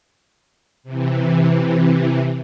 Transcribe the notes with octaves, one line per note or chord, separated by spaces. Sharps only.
C3 E3